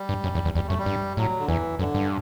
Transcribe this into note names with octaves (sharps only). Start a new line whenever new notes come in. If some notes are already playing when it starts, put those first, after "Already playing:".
Already playing: G3
G2
F#2
E2
E2
E2 G3
F#2 A3
G3
G2
A2 F#3
D3
E2 E3
F#2 D3
G2